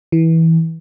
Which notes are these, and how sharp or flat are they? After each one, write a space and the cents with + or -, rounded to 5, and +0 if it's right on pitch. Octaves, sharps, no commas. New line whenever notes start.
E3 -20